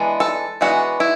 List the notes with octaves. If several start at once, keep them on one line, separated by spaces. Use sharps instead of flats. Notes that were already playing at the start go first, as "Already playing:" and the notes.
Already playing: E3 G#3 B3 D4
A4
E3 G#3 B3 D4 F#4
E4